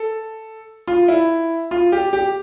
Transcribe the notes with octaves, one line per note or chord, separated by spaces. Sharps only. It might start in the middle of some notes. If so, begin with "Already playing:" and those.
Already playing: A4
F4
E4
F4
G4
G4